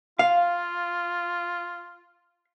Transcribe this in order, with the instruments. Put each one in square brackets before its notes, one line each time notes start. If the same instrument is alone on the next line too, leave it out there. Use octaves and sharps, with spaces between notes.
[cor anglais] F4 [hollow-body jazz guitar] F5